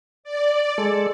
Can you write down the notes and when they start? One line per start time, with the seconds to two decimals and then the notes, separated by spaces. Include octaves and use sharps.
0.24 D5
0.78 G#3 A4